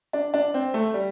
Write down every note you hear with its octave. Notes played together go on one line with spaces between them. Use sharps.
D4
D4
C4
A3
G3